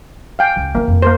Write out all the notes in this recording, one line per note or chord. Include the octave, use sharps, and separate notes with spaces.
F5 G5 G#5
C#2
D3 A#3 B3
F2 D#3
A#3 A#4 C5